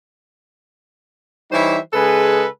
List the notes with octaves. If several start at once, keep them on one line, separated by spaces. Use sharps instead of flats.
E3 G3 D#4 C5 C#5 E5
C#3 G#3 G#4 A4 B4